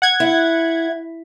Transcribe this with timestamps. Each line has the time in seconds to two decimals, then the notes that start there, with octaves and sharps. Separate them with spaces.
0.02 F#5 G#6
0.20 E4